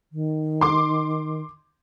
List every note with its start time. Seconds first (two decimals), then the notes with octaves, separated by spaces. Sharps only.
0.12 D#3
0.61 C6 D6